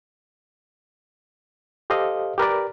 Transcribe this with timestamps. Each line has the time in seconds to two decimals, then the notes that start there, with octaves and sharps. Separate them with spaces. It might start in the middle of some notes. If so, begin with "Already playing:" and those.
1.90 G4 A4 C5 D#5 F5
2.38 G4 A#4 B4 D5